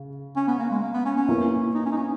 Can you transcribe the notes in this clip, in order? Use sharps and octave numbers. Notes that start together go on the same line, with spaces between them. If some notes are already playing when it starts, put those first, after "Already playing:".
Already playing: C#3
C#4
B3
A#3
G#3
A#3
B3
C#4
C#4
B2 A#3 E4
D#4
C#4
D#4
C#4